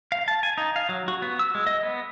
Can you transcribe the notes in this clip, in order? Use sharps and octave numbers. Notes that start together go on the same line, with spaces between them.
F5
A5
G#5
D#4
F5
F#3
F#4
B3
E6
G#3
D#5
B3